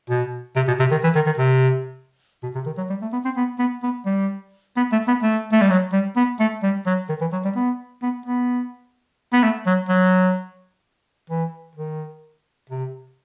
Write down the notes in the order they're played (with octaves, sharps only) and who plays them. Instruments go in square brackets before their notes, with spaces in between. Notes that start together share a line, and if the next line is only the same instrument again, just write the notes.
[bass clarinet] B2
C3
B2
C3
D#3
E3
D#3
D#3
C3
B2
C3
D#3
F#3
G3
A3
B3
C4
B3
B3
B3
G3
B3
A3
B3
A3
A3
G3
F#3
G3
B3
A3
G3
F#3
D#3
E3
F#3
G3
B3
B3
B3
B3
A3
F#3
F#3
E3
D#3
C3